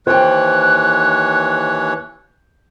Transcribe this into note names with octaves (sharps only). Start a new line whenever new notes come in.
D#2 E3 C5 C#5 G5 F#6